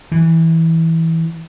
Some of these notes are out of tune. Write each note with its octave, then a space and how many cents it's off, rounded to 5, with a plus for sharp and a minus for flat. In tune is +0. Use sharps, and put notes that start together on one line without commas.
E3 -15